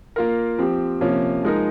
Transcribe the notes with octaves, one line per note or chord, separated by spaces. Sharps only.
A#3 F4 A#4
F3 C4 G4
C3 F3 A#3 C#4
F3 G#3 D#4 A#4